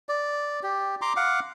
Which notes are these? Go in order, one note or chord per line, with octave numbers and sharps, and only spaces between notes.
D5
G4
A#5 C6 D6
F5 F#5 D6